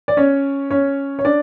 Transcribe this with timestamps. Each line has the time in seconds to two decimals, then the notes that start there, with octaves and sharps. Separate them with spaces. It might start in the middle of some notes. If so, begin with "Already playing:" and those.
0.08 D5
0.17 C#4 C#5
0.71 C#4 C#5
1.19 C#5
1.25 D4 D5